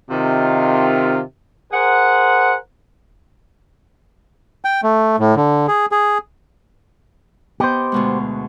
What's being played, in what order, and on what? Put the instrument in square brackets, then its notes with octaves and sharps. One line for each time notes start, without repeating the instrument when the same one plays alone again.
[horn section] C3 D#3 F4
G#4 A#4 C5 F#5
[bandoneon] G5
A3
A2
D3
G#4
G#4
[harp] B3 D#5 G5 [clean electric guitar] G4 C5
[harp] D2 B2 G#3